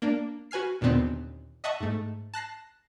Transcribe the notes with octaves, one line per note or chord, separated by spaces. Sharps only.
A#3 D4
F#4 B4 G#5 F6 C7
D#2 A#2 D3 B3 C4
D#5 E5 F#5 A5 C#6 D#6
G#2 A3
A5 F#6 A#6 C7